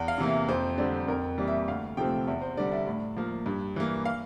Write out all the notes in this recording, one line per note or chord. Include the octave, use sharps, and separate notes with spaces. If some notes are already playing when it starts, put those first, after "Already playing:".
Already playing: E2
F5
C3 E3 A#3
E5
F2 C5
D3 G3 C4 D5
F2 A#4
E3 G3 A#3
E5
D2 F5
C3 F3 A3 C4 G5
E2 E5
C5
D3 G3 D5
E5
A2
F3 A#3
G2
E3 A#3
F5